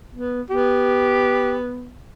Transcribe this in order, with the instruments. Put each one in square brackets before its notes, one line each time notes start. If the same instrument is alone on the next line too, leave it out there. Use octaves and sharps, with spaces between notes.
[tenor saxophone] B3
[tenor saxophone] B3 [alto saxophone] G4